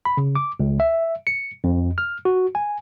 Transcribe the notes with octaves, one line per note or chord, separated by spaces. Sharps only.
B5
C#3
D6
C#2
E5
C#7
F2
F6
F#4
G#5